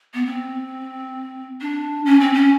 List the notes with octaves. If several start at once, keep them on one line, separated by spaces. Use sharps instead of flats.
B3
C4
D4
C#4
C4
C#4